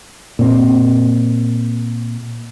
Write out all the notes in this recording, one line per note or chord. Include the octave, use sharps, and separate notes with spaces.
A#2 C4